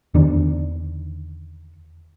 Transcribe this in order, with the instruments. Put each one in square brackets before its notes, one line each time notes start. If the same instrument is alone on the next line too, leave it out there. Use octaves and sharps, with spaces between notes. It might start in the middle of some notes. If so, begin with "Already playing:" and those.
[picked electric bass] E2 D3 D#3 D4